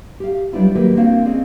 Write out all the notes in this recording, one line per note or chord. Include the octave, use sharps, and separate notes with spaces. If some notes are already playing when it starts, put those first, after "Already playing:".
G4 F5
F#3 G3 B3 D4 E4 F4
D#3 F#3 A#3 G4 A#4 B4
A#3 C4 D4 F#4 A#4 F5
C4 C#4 G#4 D5 D#5